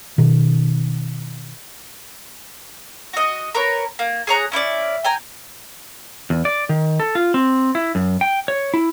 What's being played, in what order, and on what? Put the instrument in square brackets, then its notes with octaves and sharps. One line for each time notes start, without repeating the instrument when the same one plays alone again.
[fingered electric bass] B2 D#3
[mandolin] F#4 D#5
A#4 B4 C#5
A#3
G#4 C#5 A#5 F#6
C#4 E4 C5 D5
G5 G#5 A#5
[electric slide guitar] E2
D5
D#3
A4
F4
C4
E4
F#2
G5
C#5
E4